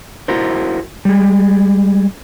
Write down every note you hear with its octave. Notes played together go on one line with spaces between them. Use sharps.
E4 F#4 A#4 C5
G3 G#3